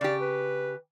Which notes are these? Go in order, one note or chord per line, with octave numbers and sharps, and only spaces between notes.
C#3 G4 D5
B4